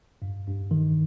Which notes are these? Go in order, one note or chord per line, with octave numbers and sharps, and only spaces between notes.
G2
G2
D#3